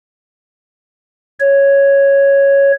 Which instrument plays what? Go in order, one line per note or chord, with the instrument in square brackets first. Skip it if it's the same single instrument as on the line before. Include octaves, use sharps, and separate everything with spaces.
[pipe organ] C#5